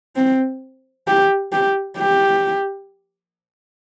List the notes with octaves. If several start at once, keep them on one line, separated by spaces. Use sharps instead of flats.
C4
G4
G4
G4